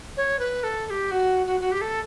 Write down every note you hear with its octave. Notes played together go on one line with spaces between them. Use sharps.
C#5
B4
A4
A4
G4
F#4
F#4
F#4
G4
A4